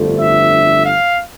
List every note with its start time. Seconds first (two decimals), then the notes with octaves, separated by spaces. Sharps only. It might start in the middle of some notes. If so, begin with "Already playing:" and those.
Already playing: G1 F2 D3 A3
0.17 E5
0.83 F5